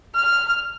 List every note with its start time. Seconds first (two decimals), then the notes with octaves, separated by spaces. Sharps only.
0.15 F6